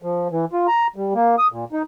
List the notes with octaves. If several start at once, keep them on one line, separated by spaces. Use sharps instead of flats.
F3
E3
F4
A#5
G3
A#3
D#6
A#2
D#4